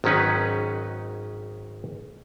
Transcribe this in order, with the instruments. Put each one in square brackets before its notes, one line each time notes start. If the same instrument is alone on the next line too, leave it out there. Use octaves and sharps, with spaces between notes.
[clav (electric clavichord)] G#1 D#3 F#3 C#4 D#4 B4